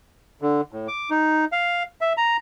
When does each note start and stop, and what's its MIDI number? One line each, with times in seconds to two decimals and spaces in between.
0.42 0.61 50
0.72 0.88 45
0.88 1.10 86
1.10 1.45 63
1.52 1.83 77
2.01 2.13 76
2.17 2.37 82